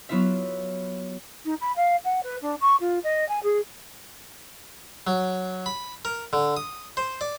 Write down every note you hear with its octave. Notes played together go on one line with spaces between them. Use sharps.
F#3 B3 E4 F4 E5
D#4
B5
F5
F#5
B4
D4
C#6
F4
D#5
G#5
G#4
F#3
B5
A#4
D3
D#6
C5
D5